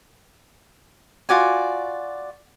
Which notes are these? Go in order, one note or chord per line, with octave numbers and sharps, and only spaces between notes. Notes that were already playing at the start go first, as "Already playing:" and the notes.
F4 F#4 D5 G#5